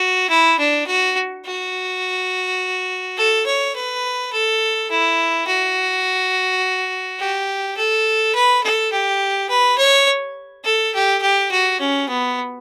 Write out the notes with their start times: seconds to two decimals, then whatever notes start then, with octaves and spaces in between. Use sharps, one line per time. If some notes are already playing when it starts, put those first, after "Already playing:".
Already playing: F#4
0.29 E4
0.59 D4
0.87 F#4
1.46 F#4
3.17 A4
3.46 C#5
3.75 B4
4.33 A4
4.90 E4
5.47 F#4
7.19 G4
7.77 A4
8.35 B4
8.64 A4
8.92 G4
9.50 B4
9.78 C#5
10.65 A4
10.94 G4
11.22 G4
11.51 F#4
11.80 C#4
12.09 B3